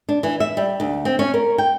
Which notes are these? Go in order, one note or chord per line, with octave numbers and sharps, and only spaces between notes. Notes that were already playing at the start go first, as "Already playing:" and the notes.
D4
E3
E5
G3
D2
C4
C#4
A#4
G5